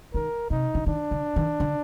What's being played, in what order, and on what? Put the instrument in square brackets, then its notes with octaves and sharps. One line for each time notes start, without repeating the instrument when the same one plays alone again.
[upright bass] D#3 [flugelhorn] A#4
[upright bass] C3 [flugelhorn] D#4
[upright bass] D3
[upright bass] D#3 [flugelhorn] D4
[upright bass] D3
D#3
D3